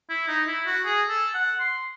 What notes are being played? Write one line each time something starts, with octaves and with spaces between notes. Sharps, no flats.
E4
D#4
E4
F#4
G#4
A4
F#5
C6